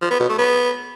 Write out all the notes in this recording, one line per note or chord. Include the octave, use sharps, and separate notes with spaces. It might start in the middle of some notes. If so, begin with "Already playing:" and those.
F3
B3
B2
A3
B3